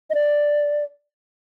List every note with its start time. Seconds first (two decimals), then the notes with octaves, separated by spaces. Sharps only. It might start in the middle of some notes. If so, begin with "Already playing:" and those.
0.10 D#5
0.14 D5